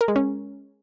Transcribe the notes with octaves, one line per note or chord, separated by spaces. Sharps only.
A#4
G#3
C#4